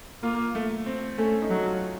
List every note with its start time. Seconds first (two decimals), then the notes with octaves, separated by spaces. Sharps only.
0.23 A#3 F4
0.55 A3
0.86 C4
1.18 A3 C#4
1.42 D#4
1.50 F#3
1.66 F4